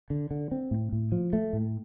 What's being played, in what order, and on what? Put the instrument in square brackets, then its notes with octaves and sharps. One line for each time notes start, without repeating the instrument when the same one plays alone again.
[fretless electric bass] D3
D3
C4
A2
A2
F3
A3
A2